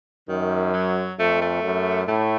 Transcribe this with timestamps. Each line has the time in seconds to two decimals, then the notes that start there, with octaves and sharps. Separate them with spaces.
0.29 F#2 D#3
0.73 F#3
1.19 F2 A3
1.41 A3
1.63 F#2
2.08 A2 A3